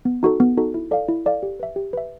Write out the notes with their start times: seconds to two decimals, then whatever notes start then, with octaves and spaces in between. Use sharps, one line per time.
0.05 B3
0.23 D#4 F#4 A4
0.40 B3
0.57 D#4 F#4 A4
0.74 E4
0.91 A4 D5 F5
1.09 E4
1.26 A4 D5 F5
1.43 G4
1.60 B4 E5
1.76 G4
1.93 B4 E5